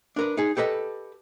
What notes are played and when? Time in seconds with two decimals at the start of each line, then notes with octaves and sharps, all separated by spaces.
0.16 D4 A#4 B4
0.37 D#4 G#4
0.57 G4 A4 B4 D#5